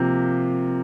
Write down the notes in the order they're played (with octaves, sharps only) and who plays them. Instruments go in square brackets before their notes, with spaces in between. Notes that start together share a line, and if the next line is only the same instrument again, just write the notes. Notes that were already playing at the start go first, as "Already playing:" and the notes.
Already playing: [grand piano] C3 F3 A#3 [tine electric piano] C4